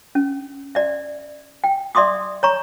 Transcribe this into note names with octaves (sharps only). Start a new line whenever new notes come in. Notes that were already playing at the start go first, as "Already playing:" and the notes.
C#4
D5 E5
G5
D5 E5 C6 D6 D#6
C#5 A#5 C#6